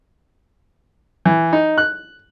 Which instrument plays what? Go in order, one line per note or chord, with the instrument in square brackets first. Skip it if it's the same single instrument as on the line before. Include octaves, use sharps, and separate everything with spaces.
[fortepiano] E3
D#4
F#6